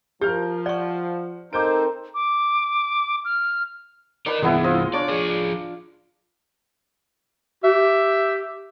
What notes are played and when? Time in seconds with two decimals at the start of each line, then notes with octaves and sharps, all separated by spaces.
0.21 F3 G4 A#4 F6 G6
0.66 D5 F#5 C#6
1.53 C4 D#4 A4 A#4 C5 D6 G6 D7
2.15 D6
3.25 F6
4.26 A#4 B4 D5 D#5
4.42 C2 E3 G#3 B3 E4
4.64 F4 C5 D#5
4.93 D4 C#5 D5
5.08 F3 G#4 D5
7.64 G4 E5